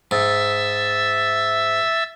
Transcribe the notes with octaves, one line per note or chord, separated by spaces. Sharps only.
G#2 E5 E6 A6